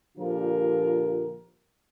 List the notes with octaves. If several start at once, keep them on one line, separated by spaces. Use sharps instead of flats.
A#2 D3 F3 F4 G4 A#4